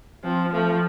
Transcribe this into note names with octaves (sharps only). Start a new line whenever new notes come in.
F3 C4
F3 A3